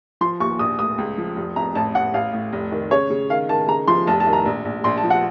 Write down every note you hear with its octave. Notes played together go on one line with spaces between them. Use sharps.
F3 C6
D#2 C#6
A#1 D#6
A2 D#6
C#2
F3
F1
F2 A#5
A1 A5
A1 F#5
A1 F5
A2
F1
D#3
C#3 C#5
C#3
D#3 F5
D#3 A5
C#3 A#5
F3 C6
F1 A5
A5
D#3
A#5
A#1
A#1
A#1 C6
A5
F3
F#5